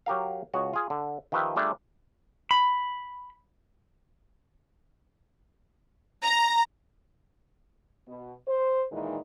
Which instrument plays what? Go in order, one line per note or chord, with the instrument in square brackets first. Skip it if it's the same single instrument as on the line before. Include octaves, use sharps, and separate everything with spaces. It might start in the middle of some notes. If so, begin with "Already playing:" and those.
[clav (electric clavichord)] F#3 G4 A#4 F5
C#2 F#4 C#5 D#5
F4 G#4
D3
D#3 F3 G4 B4 E5 G5
G3 A3 D4 F4 G#4
[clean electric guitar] B5
[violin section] A#5
[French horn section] B2
C5
A#2 D#3 E3 G#3 D#4